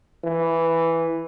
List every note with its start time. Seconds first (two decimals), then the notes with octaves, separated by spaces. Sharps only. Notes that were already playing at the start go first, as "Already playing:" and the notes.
0.24 E3